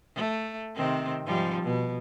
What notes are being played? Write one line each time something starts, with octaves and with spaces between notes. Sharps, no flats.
A3
C3 D#3 C4
G#2 F3 G3
B2